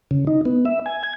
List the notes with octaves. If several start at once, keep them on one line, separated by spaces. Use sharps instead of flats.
C#3
D#4
B3
E5
G#5
G#6